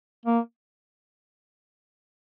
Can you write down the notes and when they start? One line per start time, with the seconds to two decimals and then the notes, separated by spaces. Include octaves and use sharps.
0.26 A#3